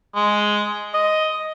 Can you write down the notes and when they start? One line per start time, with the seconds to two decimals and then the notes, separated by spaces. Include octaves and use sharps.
0.15 G#3
0.94 D#5